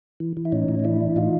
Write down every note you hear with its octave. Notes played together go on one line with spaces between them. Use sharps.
E3
E3
E4
A2 C#4 D#4
A2
D#4
E3 D4 E4
E3
A2 D#4 F4